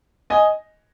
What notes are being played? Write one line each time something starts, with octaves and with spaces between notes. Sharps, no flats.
D#5 G#5